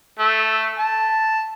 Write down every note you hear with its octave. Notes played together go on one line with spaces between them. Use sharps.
A3
A5